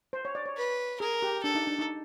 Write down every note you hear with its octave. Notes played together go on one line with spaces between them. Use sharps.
C5
C#5
D5
C#5
B4
G#4 A#4
G4
D4 A4
D#4
D4
D#4